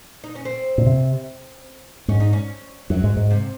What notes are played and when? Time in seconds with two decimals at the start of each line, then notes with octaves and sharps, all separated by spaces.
0.24 D#4
0.35 C#4
0.45 C4
0.78 A#2
0.86 C3
2.08 G#2 C#4
2.20 D#4
2.33 C#4
2.90 F#2 F#3
3.04 G#2
3.17 G#2
3.31 C3